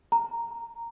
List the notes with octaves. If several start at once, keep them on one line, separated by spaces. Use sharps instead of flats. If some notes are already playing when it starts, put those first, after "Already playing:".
A#5